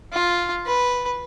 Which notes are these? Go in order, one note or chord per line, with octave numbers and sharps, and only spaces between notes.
F4
B4